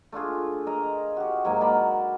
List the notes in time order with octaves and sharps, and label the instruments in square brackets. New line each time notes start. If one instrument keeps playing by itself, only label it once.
[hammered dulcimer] A3 D4 F4 G#4
A#4 D#5 A#5
F#4 G4
G#2 F#3 A#3 G#5
A#4 D5 A5 B5